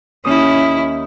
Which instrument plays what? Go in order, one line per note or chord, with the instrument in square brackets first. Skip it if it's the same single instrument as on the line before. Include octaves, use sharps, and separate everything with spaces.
[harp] D#2 D#6 [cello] C#4 E4